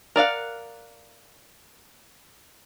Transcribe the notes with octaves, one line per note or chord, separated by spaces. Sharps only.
A#4 D5 F5 F#5